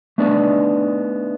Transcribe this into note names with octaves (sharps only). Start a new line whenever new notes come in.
A3 B3 D4 D#4 D5